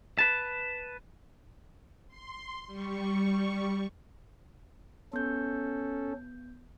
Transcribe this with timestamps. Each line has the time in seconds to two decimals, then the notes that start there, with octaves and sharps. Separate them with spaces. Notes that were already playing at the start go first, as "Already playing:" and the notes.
0.19 B4 A5
2.08 C6
2.67 G3 C#6
5.13 B3 C#4 A4 G6